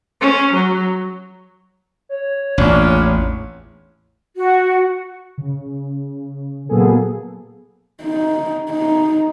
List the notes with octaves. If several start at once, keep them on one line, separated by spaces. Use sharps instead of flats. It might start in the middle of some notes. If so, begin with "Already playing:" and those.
C#4
F#3
C#5
A1 E2 A#2 C#4 D4
F#4
C#3
A#2 F#3 A#3 B3 G#4 A4
D#4
D#4